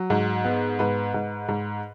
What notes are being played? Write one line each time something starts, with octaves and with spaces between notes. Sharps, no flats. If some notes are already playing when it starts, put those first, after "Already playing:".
Already playing: F#3
G#2
B3
G#2 B4
G#2
G#2